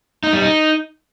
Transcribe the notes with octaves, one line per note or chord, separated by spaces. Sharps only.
D#4
G3
D#4